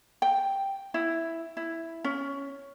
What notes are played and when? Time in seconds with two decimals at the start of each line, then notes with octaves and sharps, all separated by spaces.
0.22 G5
0.94 E4
1.57 E4
2.04 C#4